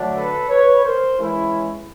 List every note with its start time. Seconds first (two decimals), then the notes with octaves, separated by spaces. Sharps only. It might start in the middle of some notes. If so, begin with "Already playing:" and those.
Already playing: D3 F#3 A3 D4
0.14 A4 B4
0.48 B4 C#5
0.83 A#4 C5
1.18 E3 G#3 C#4 E4